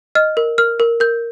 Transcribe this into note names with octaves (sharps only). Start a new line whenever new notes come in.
D#5 F6
A#4
A#4 F6
A#4
A#4 G6